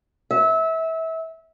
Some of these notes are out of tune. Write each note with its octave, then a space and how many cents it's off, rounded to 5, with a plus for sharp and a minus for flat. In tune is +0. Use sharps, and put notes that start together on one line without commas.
E5 -25